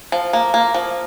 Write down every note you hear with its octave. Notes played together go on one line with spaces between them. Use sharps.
F3
A#3
A#3
F3